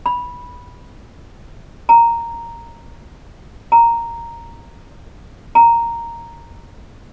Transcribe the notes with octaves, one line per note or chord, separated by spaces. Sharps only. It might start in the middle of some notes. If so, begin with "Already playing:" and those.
B5
A#5
A#5
A#5